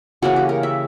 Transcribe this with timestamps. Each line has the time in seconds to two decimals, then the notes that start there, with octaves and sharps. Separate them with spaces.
0.22 C#3 E3 A#3 C#4 F#4
0.36 G4
0.49 A#4
0.63 E5